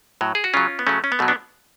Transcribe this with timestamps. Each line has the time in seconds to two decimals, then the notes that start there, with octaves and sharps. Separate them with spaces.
0.21 A2 F#3
0.35 G#4
0.44 F#4
0.54 C#3 F#3 C#4 F4
0.79 B3
0.87 C#3 F#3 A3 C#4
1.04 C#4
1.12 B3
1.19 B2 F#3 A3
1.28 B3 D4